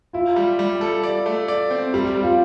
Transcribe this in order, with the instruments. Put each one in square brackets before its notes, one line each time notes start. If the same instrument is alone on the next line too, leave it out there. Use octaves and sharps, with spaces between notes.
[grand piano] E4 [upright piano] F4
[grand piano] G3
G3
A4
D5
A3
D5
C4
[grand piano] G3 [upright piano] G4
[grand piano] G3
[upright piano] F4